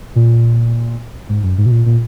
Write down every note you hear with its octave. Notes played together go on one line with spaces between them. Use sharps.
A#2
G#2
F#2
G#2
B2
A#2
A#2